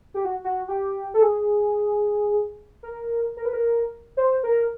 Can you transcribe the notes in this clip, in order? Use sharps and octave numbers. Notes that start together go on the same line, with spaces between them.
G4
F#4
F#4
G4
A4
G#4
A#4
A#4
B4
A#4
C5
A#4